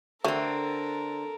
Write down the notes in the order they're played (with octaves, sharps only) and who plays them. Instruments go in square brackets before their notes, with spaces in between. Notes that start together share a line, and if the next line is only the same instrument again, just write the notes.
[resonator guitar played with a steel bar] D3 C4 [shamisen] A3 [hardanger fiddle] A4 A#4